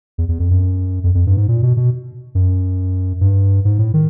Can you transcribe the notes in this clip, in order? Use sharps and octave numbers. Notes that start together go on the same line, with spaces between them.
E2
E2
F2
F#2
F2
F2
G2
G#2
A#2
B2
B2
F#2
G2
G#2
A2
D#3